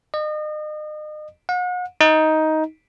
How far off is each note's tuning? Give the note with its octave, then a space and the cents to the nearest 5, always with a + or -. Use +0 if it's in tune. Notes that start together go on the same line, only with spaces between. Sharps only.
D#5 -35
F#5 -40
D#4 +10